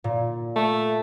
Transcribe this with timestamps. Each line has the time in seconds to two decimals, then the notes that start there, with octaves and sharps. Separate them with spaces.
0.04 A#2
0.56 A3